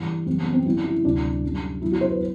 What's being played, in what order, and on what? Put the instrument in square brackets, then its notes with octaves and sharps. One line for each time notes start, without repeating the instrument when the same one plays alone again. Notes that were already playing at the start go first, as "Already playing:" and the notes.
Already playing: [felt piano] G2 E3 G3
F#2 E3 G3 C4
B3
C4
F#2 D3 G3 E4
E4
D2 C3 F#3 D4
F#2 D3 G3
E2 D3 F#3 E4
F#4
C5
B4